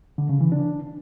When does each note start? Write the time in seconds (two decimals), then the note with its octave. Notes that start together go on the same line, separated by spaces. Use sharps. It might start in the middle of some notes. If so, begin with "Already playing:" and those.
0.18 D3
0.29 C#3
0.41 E3
0.52 D4